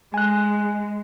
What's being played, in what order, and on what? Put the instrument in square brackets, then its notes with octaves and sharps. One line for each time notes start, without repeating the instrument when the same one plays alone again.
[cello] G#3 [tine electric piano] G#5 F#6